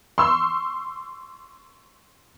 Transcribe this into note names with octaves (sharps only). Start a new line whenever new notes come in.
C6 C#6 E6